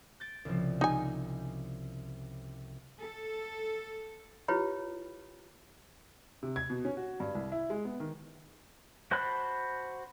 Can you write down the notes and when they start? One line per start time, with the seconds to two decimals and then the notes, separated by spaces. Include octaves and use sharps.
0.20 G6 A6 D7
0.45 C2 C#3 F3
0.81 D#4 G#5
3.01 A4
4.48 E4 F4 G4 B4 C#5 B5
6.43 C3
6.56 G#6
6.70 B2
6.85 C#4
6.97 F#4
7.20 G2
7.35 C2
7.52 E4
7.70 G#3
7.85 B3
8.00 D#3
9.11 F#4 C5 A5 B5 F#6